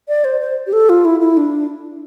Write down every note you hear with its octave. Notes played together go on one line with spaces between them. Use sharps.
D5
C5
C5
G4
A4
F4
E4
E4
D4